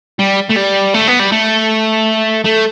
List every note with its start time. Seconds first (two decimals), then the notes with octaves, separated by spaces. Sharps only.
0.19 G3
0.50 A3
0.57 G3
0.94 A3
1.08 B3
1.20 G3
1.32 A3
2.44 A3